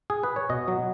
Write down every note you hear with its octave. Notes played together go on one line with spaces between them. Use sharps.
G#4
B4
C#5
B2 D#5
F#3